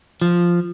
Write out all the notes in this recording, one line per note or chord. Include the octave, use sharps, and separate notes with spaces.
F3